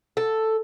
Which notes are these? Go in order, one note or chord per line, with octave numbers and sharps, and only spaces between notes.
A4